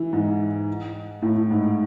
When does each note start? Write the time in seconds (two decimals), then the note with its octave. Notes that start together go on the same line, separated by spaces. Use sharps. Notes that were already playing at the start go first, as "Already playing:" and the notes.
Already playing: E3
0.13 G#2
1.22 A2
1.50 G#2